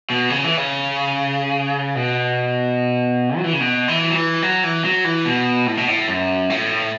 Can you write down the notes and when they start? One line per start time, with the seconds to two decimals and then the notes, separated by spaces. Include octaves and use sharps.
0.10 B2
0.30 C#3
0.44 E3
0.57 C#3
1.95 B2
3.37 F#3
3.44 E3
3.53 C#3
3.60 B2
3.88 E3
4.10 F#3
4.15 E3
4.42 F#3
4.64 E3
4.85 F#3
5.04 E3
5.25 B2
5.67 A2
5.77 B2
5.88 A2
6.08 F#2
6.50 A2